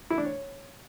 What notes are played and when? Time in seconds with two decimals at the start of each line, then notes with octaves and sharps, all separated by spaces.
0.10 E4
0.18 D4
0.25 C#5